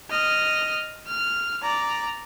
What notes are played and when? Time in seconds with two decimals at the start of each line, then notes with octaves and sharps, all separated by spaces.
0.11 D#5 F6
1.07 F6
1.63 D5 A#5